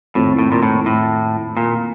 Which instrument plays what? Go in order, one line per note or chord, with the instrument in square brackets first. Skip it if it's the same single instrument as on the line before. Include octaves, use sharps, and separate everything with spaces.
[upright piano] F2 D#3 A3 C4 [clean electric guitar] A2
[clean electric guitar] A2
A#2
A2
A2
A#2